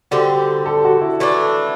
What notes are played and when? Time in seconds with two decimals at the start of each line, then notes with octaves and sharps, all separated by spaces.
0.11 D3 G3 C4 F#4 G4
0.66 A4
0.85 F#4
1.01 E4
1.20 E3 A3 D4